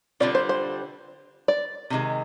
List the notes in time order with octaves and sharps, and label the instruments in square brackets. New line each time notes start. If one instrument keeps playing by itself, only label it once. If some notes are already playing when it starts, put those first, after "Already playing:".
[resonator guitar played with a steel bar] D3 G3 C4 F4 [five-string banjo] D5
[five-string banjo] C5
C5
D5
[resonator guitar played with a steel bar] C3 D#3 G#3